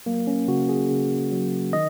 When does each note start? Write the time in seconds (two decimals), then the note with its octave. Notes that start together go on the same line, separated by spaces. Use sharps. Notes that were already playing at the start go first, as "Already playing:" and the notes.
0.06 F#3 A#3
0.27 C#4
0.48 C#3 F#4
0.69 G#4
0.90 C#3
1.32 F#3
1.73 D#3 D#5